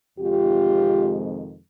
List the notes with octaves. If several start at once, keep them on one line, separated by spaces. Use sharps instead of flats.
F2 C3 D#3 G#3 F4 G4